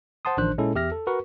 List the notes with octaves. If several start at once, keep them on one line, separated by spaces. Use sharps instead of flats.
C5 F#5 A5 C6 D#6
A1 D#3 F3 D4 C5 F#6
A#2 G#3 C#4 E4 A4
E2 G4 E5 F6 A#6
A4
F#4 A#4 B4 C#6